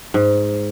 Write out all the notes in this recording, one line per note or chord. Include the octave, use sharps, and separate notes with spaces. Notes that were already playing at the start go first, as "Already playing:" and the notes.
G#2